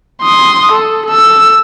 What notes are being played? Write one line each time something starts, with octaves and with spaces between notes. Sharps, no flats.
C6 D#6
A4
A4 E6